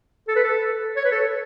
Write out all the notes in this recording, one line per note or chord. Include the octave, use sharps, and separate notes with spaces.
A4
B4
A4
C#5
B4
A4